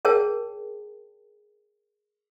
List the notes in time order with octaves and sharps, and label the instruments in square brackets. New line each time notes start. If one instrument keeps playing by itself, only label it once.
[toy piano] G#4 A#4 C#5 G5 A5